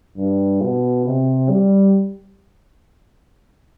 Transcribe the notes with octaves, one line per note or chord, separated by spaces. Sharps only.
G2
B2
C3
G3